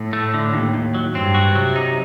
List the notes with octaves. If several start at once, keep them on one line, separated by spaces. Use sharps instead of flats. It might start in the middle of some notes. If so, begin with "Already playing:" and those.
Already playing: A2
A3
D3
D#2
D#2
F#3
G2 C4
F#4
C3 F#3
D#4